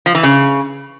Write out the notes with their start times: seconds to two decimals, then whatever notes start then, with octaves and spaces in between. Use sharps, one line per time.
0.06 F3
0.15 E3
0.23 C#3